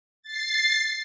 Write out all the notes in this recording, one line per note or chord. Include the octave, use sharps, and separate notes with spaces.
A6 C7